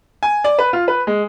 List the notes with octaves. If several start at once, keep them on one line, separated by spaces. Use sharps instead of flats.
G#5
D5
B4
F4
B4
G#3